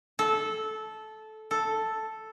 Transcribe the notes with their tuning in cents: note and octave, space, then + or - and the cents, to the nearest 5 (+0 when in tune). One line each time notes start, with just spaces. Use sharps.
A4 -15
A4 +0